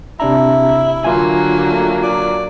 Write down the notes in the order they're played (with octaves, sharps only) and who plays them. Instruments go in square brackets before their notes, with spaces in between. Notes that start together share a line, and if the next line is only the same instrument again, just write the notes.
[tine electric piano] C3 D4 A#5 [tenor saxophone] E4
[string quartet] D3 F#3 A#3 [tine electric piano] F4 G#5
[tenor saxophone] A3
D5